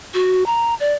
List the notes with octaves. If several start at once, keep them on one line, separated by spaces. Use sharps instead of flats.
F#4
A#5
D5